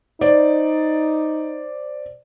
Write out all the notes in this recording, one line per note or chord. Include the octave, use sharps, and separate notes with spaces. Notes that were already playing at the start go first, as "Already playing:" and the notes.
D#4 C5 D5